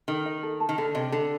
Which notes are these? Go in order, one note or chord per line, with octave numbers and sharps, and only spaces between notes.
D#3 A4
D#5
A4
A5
D#3
D3 A4
C3 D#5
D3 A4